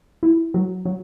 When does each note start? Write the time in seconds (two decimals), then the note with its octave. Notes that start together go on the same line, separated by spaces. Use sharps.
0.23 E4
0.54 F#3
0.85 F#3